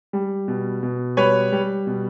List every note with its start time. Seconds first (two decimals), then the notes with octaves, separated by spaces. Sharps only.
0.13 G3
0.48 B2
0.83 B2
1.17 G3 B4 C#5
1.52 G3
1.87 B2